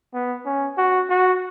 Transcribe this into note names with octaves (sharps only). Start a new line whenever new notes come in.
B3
C#4
F#4
F#4